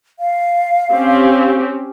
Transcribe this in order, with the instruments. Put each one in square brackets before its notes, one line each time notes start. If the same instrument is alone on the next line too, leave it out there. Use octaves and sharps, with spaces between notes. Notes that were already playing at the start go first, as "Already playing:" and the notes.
[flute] F5
[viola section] C4 C#4 G4